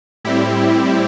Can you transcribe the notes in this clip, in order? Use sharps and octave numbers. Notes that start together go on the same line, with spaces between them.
A2 G3 C4 E4 G4